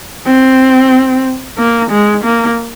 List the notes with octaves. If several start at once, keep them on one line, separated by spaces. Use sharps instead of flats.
C4
A#3
G#3
A#3